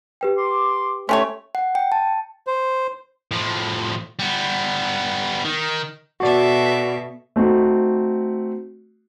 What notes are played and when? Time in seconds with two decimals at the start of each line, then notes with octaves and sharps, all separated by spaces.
0.21 G4 B4 G5
0.38 C6 D6
1.09 A3 C#4 G4 C#5 A5 C6
1.55 F#5
1.75 G5
1.92 A5
2.47 C5
3.31 A2 F3
4.19 G3 B3
5.45 D#3
6.20 B2 F#4 A4 D5 E5
7.36 A3 C4 D#4 F#4